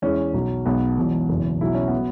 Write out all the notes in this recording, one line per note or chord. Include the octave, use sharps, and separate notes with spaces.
E2 E3 G#3 C#4
B1 B2 F#3
B1 B2 G#3 B3
E1 E2 B2 F#3
F#1 E2 B2
B1 B2 F#3 E4
C#4
B3
F#3